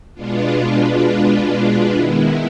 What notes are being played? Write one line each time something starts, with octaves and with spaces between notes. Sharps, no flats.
B2 G#3 B3 D4 F4
D#3 G#3 B3 E4